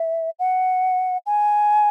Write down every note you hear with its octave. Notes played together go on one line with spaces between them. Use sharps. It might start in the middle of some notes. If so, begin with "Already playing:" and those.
Already playing: E5
F#5
G#5